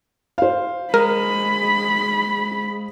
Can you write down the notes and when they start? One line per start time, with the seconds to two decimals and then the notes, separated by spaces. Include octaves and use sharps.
0.38 C5 F5
0.94 G#3 A#4 B5